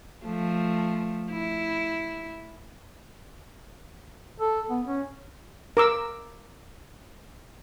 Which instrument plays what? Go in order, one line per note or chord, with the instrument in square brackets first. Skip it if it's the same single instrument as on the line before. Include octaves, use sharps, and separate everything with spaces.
[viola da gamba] F3 A3
E4
[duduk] A4
B3
C#4
[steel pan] A#4 D6 E6